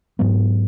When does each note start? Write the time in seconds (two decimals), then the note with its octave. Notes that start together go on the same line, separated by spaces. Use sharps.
0.19 G#2 F#3 B3